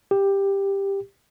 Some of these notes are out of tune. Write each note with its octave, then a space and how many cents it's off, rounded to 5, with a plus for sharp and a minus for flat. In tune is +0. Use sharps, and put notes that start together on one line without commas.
G4 +10